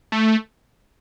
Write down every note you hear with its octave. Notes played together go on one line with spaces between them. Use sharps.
A3